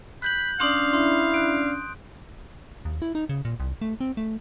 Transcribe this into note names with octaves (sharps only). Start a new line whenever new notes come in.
B5 F#6 G6 F#7
C#4 D4 D5 F5 C6 D#6
E4 C6
F#6 D7
D#2
E4
D#4
C#3
A#2
C2
A3
C4
A3